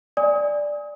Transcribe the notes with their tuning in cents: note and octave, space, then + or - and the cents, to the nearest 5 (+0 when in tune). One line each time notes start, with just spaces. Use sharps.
D5 +0 G#5 -15 D#6 +30